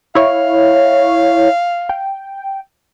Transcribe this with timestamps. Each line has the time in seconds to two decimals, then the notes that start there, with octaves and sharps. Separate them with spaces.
0.15 E4 C#5 F5
1.89 G5